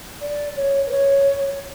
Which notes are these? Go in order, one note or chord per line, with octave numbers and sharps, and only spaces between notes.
D5
C#5
B4
C#5